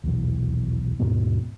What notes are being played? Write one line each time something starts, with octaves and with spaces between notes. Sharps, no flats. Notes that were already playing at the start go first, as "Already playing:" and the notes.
D#1 B1 E2
D#2 G#2 B2 B3